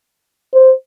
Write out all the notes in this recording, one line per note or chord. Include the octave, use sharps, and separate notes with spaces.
C5